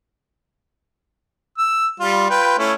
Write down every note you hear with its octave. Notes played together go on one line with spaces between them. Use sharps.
E6
G3 F4
F4 B4 G5
A3 C#4 E4